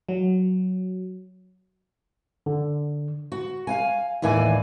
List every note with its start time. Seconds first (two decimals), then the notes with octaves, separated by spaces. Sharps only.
0.09 F#3
2.46 D3
3.32 F#4
3.67 F5 F#5 G#5
4.22 D#2 A2 E3 D5 G#5